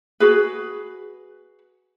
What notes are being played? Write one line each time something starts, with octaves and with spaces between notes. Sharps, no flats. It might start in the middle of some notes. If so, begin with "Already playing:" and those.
F#4 G#4 B4